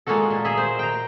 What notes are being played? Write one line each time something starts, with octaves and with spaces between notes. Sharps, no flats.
G#3 A#3 F4 F#4 A4
A#2
G#4 D#5 E5
C5
G5 A#5